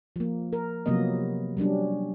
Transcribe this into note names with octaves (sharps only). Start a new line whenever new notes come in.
F3 A#3
A#4
C3 F3 F#3 A#3 B3 D#5
F#3 G3 C#4 D4